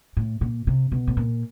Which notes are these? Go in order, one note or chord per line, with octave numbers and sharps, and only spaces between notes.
A2
A#2
C3
B2
A2
A#2